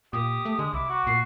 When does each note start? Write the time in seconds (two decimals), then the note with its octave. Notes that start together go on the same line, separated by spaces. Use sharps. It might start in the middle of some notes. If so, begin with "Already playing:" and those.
0.13 A#2 G4 D#6
0.45 A3
0.59 D3 G#3
0.73 C2 E4 D6
0.89 F#4
1.07 A#2 C7